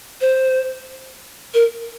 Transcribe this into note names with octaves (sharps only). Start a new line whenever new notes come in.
C5
A#4